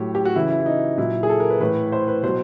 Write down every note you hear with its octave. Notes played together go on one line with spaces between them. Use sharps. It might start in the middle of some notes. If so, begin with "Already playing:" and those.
Already playing: A2 F#3 G4
G4
F#4
C#3 E3 E4
E4
E4
D#4
A#2 F#3 E4
G#4
A4
A#4
B4
A2 E3 B4
C5
B4
B2 F#3 C5